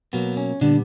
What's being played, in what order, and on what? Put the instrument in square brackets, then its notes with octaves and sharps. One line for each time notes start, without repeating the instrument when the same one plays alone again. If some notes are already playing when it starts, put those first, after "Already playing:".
[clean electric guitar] B2 F#3 A#3 B3
C#4
A#2 D3 G3 B3 D4